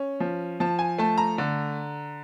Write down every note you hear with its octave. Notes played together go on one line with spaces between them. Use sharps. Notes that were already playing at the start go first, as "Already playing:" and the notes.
Already playing: C#4
F3
F3 A5
G#5
A3 A5
A#5
D3